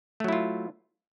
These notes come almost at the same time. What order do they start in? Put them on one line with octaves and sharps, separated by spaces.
A3 F#3 E4 F4